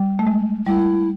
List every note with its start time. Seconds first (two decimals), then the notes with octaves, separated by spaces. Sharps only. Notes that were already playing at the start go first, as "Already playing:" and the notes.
Already playing: G3
0.19 A3
0.27 G#3
0.66 G3 E4